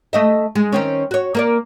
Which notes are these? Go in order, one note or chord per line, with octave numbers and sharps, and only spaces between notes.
A3 D#5 E5
G#3
D#3 C4 C#4
F#4 C#5
A#3 A#4 D5